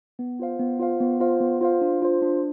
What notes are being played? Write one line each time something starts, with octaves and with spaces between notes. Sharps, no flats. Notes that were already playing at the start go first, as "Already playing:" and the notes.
B3
F4 C5 F5
B3
F4 C5 F5
B3
F4 C5 F5
B3
F4 C5 F5
D4
F4 C5
D4